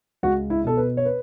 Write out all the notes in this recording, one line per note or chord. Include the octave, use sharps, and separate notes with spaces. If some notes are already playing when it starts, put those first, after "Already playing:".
C#2 F#4
E4
B2 A4
B4
C#5
B4